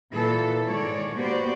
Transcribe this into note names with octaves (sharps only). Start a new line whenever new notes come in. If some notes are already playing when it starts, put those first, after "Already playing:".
A#2 E3 A4
G#2 D#3 G#3 C#5 D5
A#3 B3 F#4 G4 C5 D5